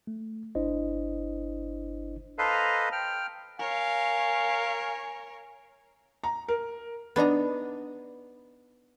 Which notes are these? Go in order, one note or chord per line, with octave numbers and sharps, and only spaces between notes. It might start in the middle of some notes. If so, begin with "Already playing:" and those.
A3
G1 D4 E4 C5 D#5
A4 B4 C5 D#5 F5 A#5
G5 F6
A#4 C#5 F5 G#5
A#5
A#4
B3 D4 D#4 A#5